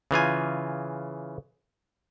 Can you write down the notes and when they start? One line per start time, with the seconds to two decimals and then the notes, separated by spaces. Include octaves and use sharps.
0.11 C#3 E3 F4 G#5